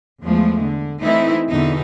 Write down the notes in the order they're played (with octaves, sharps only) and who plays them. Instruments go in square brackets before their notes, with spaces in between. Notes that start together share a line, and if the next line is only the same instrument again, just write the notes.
[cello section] E2 F3 G#3 A3
D3
E3 A3 C4 D#4 E4
E2 B2 D3 E3 D#4